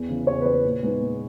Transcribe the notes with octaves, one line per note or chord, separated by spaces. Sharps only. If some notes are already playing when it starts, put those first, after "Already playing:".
Already playing: E2
C#3 E3
E2 C#5
B4
C#3 E3 C#5
A#2
G#3 B3 D#4
A#2